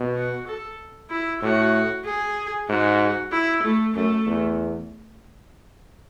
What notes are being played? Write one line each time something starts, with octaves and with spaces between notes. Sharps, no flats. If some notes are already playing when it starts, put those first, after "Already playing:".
Already playing: B2
F#4
A4
E4
A2 F#4
G#4
G#2 F#4
E4
A3
F#2 A3
E2